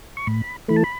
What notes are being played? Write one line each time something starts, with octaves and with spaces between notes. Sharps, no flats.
C#6
A2 B5
E3 A3 B5
A5
B5